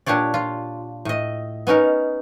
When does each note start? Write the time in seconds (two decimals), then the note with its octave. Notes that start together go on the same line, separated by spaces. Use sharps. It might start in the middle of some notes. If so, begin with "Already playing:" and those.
0.06 A#2 D4 G4 C#5 D5
0.34 F4
1.05 A2 D#5
1.67 B3 C#4 D#4 A#4